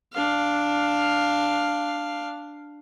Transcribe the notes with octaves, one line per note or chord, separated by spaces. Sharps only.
D4 F5